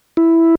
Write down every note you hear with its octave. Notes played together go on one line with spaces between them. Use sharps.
E4